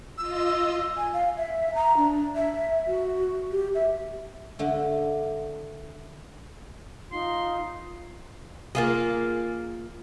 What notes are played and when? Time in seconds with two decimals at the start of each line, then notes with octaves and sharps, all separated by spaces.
0.18 F4 D#5 E6
0.97 G#5
1.14 F5
1.37 E5
1.75 A#5
1.97 D4
2.36 E5
2.87 F#4
3.52 G4
3.75 E5
4.59 D3 A3 D4
7.12 D#4 F4 C6
8.75 A#3 F4 G#4